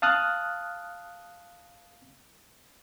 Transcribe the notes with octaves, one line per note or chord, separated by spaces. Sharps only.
F5 A5 D#6 F6 F#6